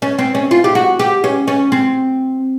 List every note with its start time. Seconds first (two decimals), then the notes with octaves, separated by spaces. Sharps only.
0.02 C#4
0.19 C4
0.35 C#4
0.51 F4
0.64 G4
0.75 F#4
0.99 G4
1.24 C#4
1.48 C#4
1.72 C4